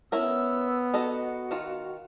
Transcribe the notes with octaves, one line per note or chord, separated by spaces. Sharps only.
B3 C#4 E4 A#4 E6
D#4 F#4 A4 D#5
D#3 F4